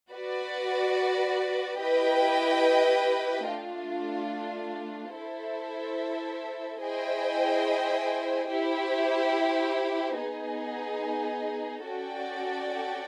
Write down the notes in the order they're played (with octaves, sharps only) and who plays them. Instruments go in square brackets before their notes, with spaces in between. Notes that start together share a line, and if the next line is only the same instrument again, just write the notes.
[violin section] F#4 B4 D5
E4 G4 B4 D#5 G5
A3 D4 F4
E4 A4 C5 E5
E4 G#4 C5 D#5 G5
E4 G4 C5
B3 D#4 G#4
C#4 F#4 A4 D5 G5